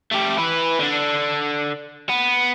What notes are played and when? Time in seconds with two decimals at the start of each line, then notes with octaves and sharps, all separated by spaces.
0.11 A3 G4
0.38 E4 B4
0.79 D3 D4
2.09 B3